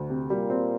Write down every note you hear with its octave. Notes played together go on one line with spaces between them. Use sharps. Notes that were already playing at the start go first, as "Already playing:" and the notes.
Already playing: D2
C3
A#2 G3
C4